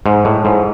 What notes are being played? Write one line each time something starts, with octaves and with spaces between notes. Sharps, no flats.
G#2
A2
G#2